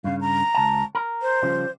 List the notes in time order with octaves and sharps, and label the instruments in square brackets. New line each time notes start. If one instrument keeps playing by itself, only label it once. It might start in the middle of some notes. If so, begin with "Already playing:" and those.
[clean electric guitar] G2 C#3 [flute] F5
[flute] A#5
[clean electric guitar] C#2 A5
A#4
[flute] C5
[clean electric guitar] C#3 F3 G3